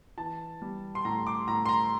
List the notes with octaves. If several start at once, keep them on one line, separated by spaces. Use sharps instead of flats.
E3 A5
G3
C6
A2 A#5
D6
A2 A#5
C6
A#5